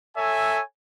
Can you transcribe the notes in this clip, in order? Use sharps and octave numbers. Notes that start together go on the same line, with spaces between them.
A4 C#5 E5 G#5